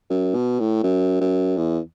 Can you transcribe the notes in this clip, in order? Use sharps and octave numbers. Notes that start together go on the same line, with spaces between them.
F#2
B2
A2
F#2
F#2
E2